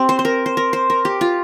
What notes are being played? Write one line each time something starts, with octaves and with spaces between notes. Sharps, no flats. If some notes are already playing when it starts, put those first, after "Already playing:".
Already playing: C4 G4
C5
C5
A#4
C5
A#4
C5
A#4
G4
F4